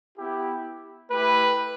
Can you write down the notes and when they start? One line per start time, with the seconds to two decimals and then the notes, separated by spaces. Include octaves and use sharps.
0.18 B3 E4 G4
1.11 A3 E4 G4 B4